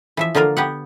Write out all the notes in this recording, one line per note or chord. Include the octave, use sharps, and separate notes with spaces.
E3 F3 E5
D3 F3 A#3 F4 A#4
B3 G4 F#5